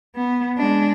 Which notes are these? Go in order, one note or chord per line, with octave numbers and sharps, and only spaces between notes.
B3
G#3 D4